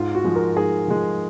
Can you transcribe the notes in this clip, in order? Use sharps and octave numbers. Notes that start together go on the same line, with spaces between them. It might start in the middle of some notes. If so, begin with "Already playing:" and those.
Already playing: G#2 F4
F#4
F3 G#3
A#4
G#2 G#4
F3 G#3